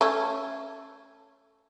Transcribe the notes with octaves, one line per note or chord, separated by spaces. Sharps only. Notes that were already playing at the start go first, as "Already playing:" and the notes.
A3 C#4